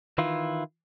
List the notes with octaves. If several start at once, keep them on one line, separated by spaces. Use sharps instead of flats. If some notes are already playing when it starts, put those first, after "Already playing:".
D#3 E3 E4 F4